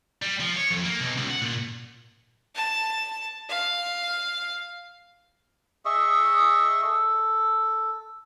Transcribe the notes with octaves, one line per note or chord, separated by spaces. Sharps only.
G3
F3
C#5
F2
A#3
B1
C#2
F#5
A#2
A5
F5
G#4 D#5 E5 C#6
A4